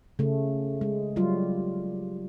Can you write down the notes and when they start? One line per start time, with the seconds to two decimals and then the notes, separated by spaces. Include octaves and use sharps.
0.19 C#3 A3
0.81 G#3
1.16 F#3 G3 F4